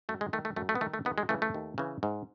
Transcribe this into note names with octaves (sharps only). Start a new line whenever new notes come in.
F#2 A3
G#3
D#3 A3
A3
F#2 A3
A3
B3
D#3 A3
A3
D#2 B3
G#3
C#3 E3 A3
A3
D#2
C#3 E3
G#2